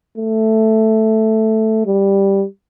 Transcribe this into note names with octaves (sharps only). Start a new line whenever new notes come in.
A3
G3